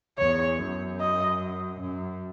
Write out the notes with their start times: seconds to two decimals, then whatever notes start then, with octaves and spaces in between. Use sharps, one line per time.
0.18 E2 C#5
0.59 F#2
1.00 D#5
1.80 F#2